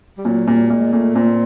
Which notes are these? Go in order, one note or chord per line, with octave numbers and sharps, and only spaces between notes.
G3
A#2 F#3
A#2 G3
A#2 G#3
A#2 A3
A#2 C4